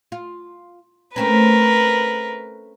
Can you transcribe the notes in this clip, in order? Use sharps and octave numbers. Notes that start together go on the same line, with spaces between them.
F4
A3 C4 C#4 A#4 B4